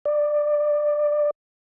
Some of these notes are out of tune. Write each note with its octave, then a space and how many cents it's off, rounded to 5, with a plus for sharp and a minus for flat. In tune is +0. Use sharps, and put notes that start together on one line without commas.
D5 +15